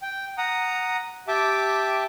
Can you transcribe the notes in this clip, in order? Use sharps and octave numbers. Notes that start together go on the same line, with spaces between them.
G5
F#5 A#5 D#6
G4 E5 G5 A5 D6